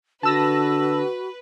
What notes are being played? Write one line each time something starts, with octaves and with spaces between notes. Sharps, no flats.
D3 F#4 B4 A5 E6 A#6